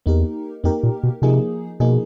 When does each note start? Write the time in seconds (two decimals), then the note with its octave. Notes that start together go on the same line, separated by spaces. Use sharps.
0.06 E2 A#3 D#4 G4 A#4
0.64 F2 A#3 D#4 G4 A#4
0.83 A#2
1.03 B2
1.22 C3 F3 A#3 D#4 G#4
1.80 B2 F3 A#3 D#4 G#4